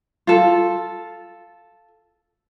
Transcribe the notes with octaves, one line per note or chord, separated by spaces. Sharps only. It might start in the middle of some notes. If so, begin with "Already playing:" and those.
F4 A4